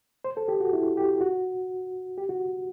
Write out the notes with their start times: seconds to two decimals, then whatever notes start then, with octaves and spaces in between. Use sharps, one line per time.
0.24 C5
0.37 A4
0.48 G4
0.60 F#4
0.73 E4
0.97 G4
1.21 F#4
2.18 G4
2.29 F#4